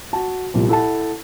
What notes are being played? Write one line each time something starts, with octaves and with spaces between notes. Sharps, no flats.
F#4 A5
C2 A#2 F3
E4 A4 F#5 A5